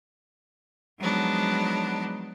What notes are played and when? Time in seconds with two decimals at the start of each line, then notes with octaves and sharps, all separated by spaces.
0.98 F3 F#3 G#3 B3 D4 D#4